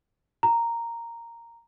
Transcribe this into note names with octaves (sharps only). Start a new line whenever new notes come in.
A#5